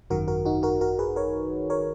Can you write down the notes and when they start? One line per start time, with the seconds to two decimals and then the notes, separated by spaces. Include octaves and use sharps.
0.10 G#1 F#2 D#3 F#4 A#4
0.28 F#4 A#4
0.45 D#4 F#4
0.63 F#4 A#4
0.81 F#4 A#4
0.99 G#4 B4
1.16 A#4 C#5
1.70 A#4 C#5